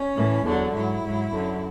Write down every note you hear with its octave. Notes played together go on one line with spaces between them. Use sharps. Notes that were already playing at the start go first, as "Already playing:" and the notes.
Already playing: C#4
A2 E3
E2 D3 F#3 D4
G#2 F#3 E4
G#2 F#3
F#2 D3 F#3